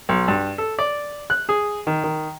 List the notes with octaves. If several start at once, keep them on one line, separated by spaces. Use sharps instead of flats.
B1
G2
A4
D5
F#6
G#4
D#3
D#3